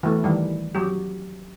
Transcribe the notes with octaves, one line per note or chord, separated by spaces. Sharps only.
E3 A3
D#3 E3 G3
F#3 G4